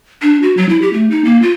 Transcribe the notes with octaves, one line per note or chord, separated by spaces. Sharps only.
D4
F#4
F#3
E4
G4
A3
D#4
A#3
F4